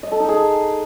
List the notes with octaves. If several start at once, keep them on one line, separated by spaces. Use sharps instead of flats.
D#5
A4
D#4
G#4